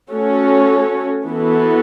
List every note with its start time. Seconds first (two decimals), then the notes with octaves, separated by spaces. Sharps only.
0.11 A3 C#4 F#4 A4 C#5
1.26 E3 B3 F#4 A4